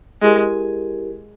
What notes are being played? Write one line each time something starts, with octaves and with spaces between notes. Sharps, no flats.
G#3 E4 G4 A#4